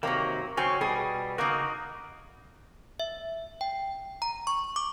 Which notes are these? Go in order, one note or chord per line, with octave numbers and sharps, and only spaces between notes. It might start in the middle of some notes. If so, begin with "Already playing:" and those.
C3 D#3 F#3 A#3
C#3 F#3 C4 C#4
B2 G3 G#4
C#3 A#3 D#4 F#4
E5
G5
A#5
C#6
D6